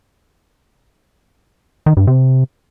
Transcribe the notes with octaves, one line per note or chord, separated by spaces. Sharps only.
D#3
G2
C3